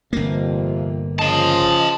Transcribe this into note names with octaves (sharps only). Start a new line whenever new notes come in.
G1 F2 C3 A#3
C#3 F3 D#5 A5 C6